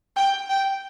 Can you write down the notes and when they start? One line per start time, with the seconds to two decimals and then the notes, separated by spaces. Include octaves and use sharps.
0.16 G5
0.49 G5